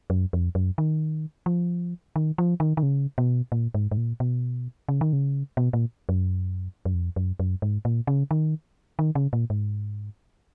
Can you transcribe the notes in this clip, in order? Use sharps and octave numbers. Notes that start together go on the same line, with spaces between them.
F#2
F2
F#2
D#3
F3
D#3
F3
D#3
D#3
C#3
B2
A#2
G#2
G#2
A#2
B2
C#3
D#3
C#3
B2
A#2
F#2
F#2
F2
F#2
F#2
G#2
A#2
C#3
D#3
D#3
C#3
A#2
G#2